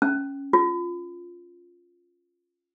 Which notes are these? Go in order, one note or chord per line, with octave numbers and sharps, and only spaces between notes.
C#4
F4